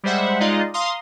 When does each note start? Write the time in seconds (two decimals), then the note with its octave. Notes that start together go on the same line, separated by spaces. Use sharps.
0.03 G3 G#3 C5 E5 F#5
0.40 G#3 D#4 F4 D5 D#5 F5
0.74 F5 A#5 C6 D#6